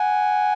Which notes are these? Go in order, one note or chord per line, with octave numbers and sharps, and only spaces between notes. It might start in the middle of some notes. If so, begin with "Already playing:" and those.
Already playing: F#5 G#5